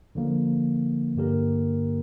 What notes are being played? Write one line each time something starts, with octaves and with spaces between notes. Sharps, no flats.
D3 F3 A#3
G2 D3 A#3 G4 A#4